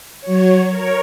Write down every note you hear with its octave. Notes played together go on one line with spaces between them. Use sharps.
F#3 C#5
A#4 C#5